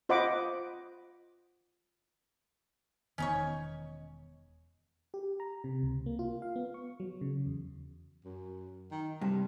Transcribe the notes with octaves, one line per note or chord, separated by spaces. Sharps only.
F4 C5 D#5 F#5 B5 D6
E1 D#3 B3 C#4 D#4 C#5
G4
A#5
C3
C#2
A#3
F4
F5
B3
C#6
F#3
C#3
E2
F#2
D#3
G2 C3